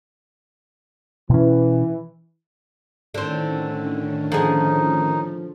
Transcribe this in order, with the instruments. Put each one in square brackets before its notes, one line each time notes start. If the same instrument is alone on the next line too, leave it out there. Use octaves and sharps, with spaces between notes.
[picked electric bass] B2 C#4 [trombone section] E3
[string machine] A2 D#3 C#4 [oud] D3 C4
[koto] D3 [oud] F3 G#4 [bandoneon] D#4